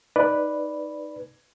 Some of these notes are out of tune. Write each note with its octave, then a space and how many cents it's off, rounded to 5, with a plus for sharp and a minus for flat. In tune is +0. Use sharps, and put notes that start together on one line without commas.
D#4 +0 B4 +0 D5 +0